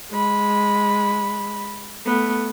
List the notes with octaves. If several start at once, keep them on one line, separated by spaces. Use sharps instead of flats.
G#3 B5
A3 B3